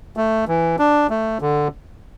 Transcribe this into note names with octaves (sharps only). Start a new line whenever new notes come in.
A3
E3
D4
A3
D3